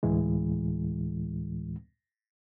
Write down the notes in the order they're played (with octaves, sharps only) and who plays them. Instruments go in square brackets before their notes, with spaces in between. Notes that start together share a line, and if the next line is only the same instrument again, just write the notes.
[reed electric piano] D2 A2 E3 G#3